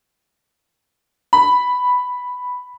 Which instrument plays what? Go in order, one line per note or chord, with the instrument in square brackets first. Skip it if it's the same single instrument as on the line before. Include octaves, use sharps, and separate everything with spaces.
[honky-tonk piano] B5